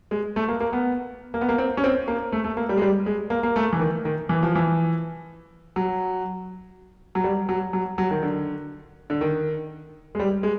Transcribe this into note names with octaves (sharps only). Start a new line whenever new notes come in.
G#3
A3
A#3
A#3
B3
A#3
B3
A#3
C4
C#4
C4
A#3
A3
A3
A#3
G3
G#3
G3
G#3
A#3
A#3
A3
E3
D#3
D#3
E3
F3
E3
F#3
F#3
G3
F#3
F#3
F#3
D#3
D3
D3
D#3
G#3
G3
G#3